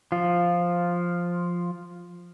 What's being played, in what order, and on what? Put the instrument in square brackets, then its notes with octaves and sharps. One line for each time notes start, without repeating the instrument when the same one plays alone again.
[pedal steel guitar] F3 F4